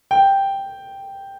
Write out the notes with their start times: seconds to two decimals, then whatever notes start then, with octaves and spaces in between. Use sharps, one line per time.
0.11 G5